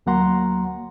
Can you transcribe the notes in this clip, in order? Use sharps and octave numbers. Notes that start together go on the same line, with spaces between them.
D2 F#3 A#3 F#5 A#5 C6